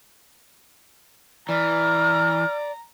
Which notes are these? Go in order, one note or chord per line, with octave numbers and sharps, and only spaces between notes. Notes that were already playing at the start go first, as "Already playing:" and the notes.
E3 D5 A#5 F6